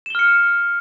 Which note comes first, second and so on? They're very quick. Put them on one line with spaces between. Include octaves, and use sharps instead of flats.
E7 G7 F6 C#7